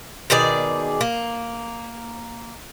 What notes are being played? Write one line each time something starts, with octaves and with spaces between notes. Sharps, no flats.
B2 D#3 G#4 D5
A#3